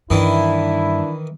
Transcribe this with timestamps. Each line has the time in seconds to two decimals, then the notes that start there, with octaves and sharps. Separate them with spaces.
0.10 G2 D#3 E3 D4 E4